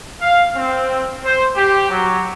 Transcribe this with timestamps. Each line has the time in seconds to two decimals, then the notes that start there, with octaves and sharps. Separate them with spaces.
0.22 F5
0.55 C4
1.25 C5
1.56 G4
1.89 F#3